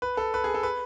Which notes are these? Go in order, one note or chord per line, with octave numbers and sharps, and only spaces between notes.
B4
A4
B4
G#4
A4
B4